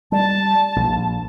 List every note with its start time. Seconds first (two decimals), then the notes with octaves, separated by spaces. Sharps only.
0.12 G3 A5
0.76 A#1